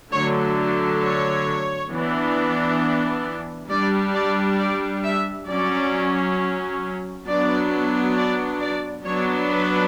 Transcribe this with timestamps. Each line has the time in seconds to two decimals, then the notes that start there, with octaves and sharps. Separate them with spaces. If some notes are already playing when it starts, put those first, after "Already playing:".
0.12 D3 F#3 A3 C#5
1.02 C#5
1.91 E3 B3 D4
3.70 G3 D4 D5
4.14 D5
4.58 D5
5.03 E5
5.48 F#3 C#4 D5
7.27 F#3 B3 D4 D5
8.16 D5
8.61 D5
9.05 F#3 B3 D4 C#5
9.50 B4